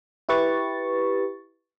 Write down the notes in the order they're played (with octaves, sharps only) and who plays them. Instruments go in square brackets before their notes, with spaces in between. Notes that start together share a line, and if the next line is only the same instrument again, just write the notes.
[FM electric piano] E4 G4 B4 C#6 A6